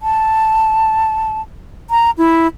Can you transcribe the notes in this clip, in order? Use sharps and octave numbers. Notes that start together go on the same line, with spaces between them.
A5
A#5
E4